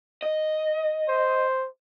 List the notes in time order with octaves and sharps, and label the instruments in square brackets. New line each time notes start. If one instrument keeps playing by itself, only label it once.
[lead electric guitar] D#5
[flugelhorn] C5